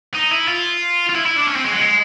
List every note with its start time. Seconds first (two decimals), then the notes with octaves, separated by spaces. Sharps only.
0.15 D#4
0.32 E4
0.48 F4
1.09 F4
1.14 E4
1.25 E4
1.36 D4
1.48 C#4
1.56 C4
1.64 G#3
1.72 F#3
1.80 G#3